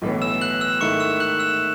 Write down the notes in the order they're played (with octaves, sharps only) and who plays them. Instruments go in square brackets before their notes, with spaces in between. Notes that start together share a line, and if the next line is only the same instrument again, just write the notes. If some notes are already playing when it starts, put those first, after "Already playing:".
[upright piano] B1 A2 E3 B3
[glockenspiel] E6 E7
F#6 F#7
E6 E7
[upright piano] G#2 D#3 A3 E4 [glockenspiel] C#6 C#7
[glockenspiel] E6 E7
F#6 F#7
E6 E7